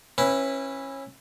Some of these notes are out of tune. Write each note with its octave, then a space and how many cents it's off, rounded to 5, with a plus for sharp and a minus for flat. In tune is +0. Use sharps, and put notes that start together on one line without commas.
C#4 -25 E4 +0 B4 +0